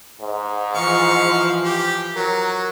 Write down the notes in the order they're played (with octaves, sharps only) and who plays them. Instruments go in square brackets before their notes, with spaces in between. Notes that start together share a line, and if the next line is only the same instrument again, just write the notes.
[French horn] G#2
[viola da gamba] E3 F3 E4 [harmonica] F5 C#6
[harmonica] G4
[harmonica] F#3 [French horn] A#4